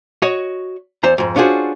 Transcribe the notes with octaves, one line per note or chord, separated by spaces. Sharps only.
F#4 C#5 D#5
E2 C5 A#5
F2 G#2
C#4 D4 F4 F#4 G#4 C5